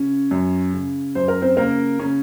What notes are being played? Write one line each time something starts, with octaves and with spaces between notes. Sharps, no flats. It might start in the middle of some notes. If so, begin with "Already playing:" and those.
Already playing: C#3 C#4
F#2
C#3
F#2 C5
A#4
C4 C5
C#3 A#3 A#4
C#3 C#4